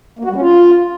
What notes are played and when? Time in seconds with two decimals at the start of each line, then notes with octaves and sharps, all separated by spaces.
0.19 A#3
0.25 F#4
0.30 G3
0.36 C#4
0.41 F4